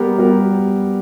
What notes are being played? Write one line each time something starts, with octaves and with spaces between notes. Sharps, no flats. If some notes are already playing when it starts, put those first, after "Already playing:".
Already playing: G3 B3 G4 A#4
G3 B3 G4 A#4